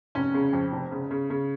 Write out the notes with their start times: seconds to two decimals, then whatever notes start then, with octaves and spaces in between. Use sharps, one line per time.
0.15 F1 C#4
0.34 C#3
0.53 F2
0.72 F1
0.91 C#3
1.11 C#3
1.30 C#3